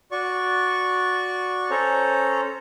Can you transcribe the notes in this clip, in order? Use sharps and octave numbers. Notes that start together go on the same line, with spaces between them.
F#4 D5 C#6
C#4 A4 C5 C#5 A#5